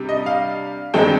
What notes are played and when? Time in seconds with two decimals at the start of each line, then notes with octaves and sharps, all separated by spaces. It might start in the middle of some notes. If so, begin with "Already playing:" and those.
Already playing: C3 G3 D4
0.09 D#5
0.26 F5
0.94 G2 D#3 G#3 C4 D#4 G5